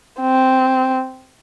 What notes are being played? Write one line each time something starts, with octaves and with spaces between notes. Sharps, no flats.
C4